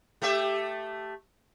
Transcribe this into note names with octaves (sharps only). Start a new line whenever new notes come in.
A3 G4 E5